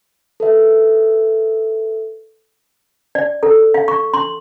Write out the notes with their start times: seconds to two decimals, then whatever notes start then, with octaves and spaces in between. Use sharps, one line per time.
0.40 A4 B4 E5
3.15 D5
3.43 A4
3.74 F5
3.88 C#6
4.14 C6